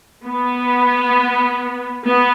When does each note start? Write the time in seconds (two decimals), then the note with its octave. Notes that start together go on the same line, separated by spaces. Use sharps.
0.24 B3
2.04 B3